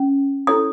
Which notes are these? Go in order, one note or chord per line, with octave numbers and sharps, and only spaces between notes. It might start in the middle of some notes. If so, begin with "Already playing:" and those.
Already playing: C#4
E4 A4 C#5 D#6